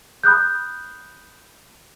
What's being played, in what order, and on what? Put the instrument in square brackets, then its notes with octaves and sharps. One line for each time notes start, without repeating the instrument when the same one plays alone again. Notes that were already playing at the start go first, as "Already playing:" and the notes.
[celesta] B5 D#6 F#6 G6